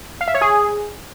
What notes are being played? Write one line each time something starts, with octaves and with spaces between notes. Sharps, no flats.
F5
E5
C#5
G#4